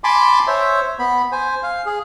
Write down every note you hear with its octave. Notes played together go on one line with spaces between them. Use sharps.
G#5 A5 B5 C6 D6
C5 C#5 E5
B3 B5
C5 G#5
F5
G#4